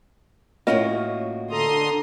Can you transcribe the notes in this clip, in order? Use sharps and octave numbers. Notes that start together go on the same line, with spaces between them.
A2 A#3 C#4 F4 F#4 D#5
D3 A4 A#5 C6 D#6